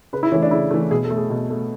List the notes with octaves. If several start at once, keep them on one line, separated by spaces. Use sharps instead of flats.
C#3 B4
E4
E3 A3 C#4
D4
C#3 E4
E3 A3
B2 G#4
A4
A3
G#4
B2
A3